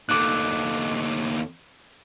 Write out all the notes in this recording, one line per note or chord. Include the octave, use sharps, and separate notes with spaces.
D#2 A3 D6 F#6